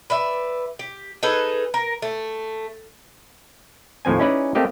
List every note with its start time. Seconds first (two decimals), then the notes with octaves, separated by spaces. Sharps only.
0.10 B4 D5 E5
0.79 G4
1.23 D#4 G#4 A4 B4
1.74 A#4
2.02 A3
4.05 D#2 A2 F3 C4 G#5
4.19 C#4 D#4 E4 G#4 B4 D5
4.55 A3 A#3 C4 G4 D#5